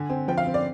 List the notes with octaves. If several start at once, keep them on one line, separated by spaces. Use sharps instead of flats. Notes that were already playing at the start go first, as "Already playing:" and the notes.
Already playing: D3 G#5
C4
F3 G5
F5
C4
D5